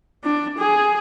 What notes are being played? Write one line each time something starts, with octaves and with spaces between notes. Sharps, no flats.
D4
G#4